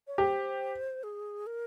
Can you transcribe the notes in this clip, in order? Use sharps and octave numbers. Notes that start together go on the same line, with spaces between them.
C#5
G4 C5
G#4
A#4